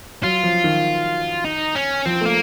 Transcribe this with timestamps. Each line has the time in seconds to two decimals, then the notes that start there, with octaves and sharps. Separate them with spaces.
0.23 F#3 F4
0.43 F3
0.64 D#3
1.45 D#4
1.75 C#4
2.06 F3 C4
2.21 A3 A#3